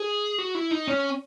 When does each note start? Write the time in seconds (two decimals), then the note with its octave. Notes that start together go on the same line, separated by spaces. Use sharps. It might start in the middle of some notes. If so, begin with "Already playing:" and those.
Already playing: G#4
0.38 F#4
0.55 E4
0.71 D#4
0.88 C#4